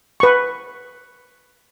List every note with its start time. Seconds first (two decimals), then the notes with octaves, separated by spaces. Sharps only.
0.20 B4 C#6